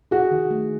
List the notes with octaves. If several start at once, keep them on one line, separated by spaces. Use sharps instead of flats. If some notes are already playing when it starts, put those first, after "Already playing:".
F#4 G#4
D#3
A3